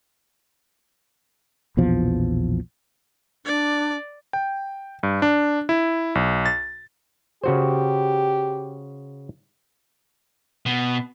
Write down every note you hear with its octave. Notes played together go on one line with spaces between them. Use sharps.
A#1 E2 B2 F3
D4 D5
G5
G2
D4
E4
B1
A6
C#3 F#4 G4 C5
B2